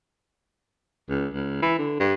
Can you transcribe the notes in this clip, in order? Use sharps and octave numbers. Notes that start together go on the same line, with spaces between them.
C#2
C#2
E3
D3
G2